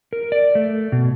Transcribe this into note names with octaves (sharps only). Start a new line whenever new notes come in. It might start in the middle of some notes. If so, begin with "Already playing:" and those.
A#4
D5
A3
B2